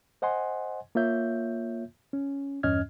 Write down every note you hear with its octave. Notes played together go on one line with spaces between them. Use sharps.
C5 D#5 F#5 G#5 C6
A#3 F4 C#5 E5 G6
C#4
E2 G2 C#4 D#5 F6 G#6